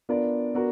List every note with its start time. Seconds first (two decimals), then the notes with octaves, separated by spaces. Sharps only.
0.09 B3 D4 F4 A#4 D5
0.54 B3 D4 F#4 A#4